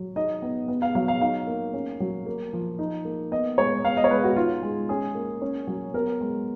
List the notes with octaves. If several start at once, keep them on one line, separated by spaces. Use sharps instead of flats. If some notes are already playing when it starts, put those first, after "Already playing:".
Already playing: F#3
D#4 D#5
B3
B3
F5
F#3 F5
F5
D#4 F5
A#3
C#4
F#3
A#3
F3
D#4
A#3
B3 D#5
G#3 C#5
B3 F5
D#5
C#5
G#3 B4
F#4
D#4 F4
G#3
C#4 G#4
A#3
C#4
F#3
B3 A#4
G#3